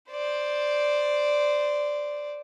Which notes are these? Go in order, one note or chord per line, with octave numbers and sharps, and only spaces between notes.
C5 D5